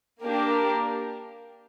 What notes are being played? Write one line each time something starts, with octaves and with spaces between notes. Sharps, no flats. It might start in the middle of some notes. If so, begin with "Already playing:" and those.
A#3 D4 G4 A#4